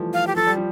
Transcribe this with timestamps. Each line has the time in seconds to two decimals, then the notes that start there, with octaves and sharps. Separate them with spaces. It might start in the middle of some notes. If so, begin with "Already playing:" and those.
Already playing: E3 F3 G3 A3
0.14 F5
0.27 G4
0.36 F3 A4
0.47 G3
0.57 F3